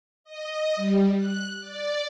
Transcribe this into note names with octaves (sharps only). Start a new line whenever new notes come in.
D#5
G3
F#6
D5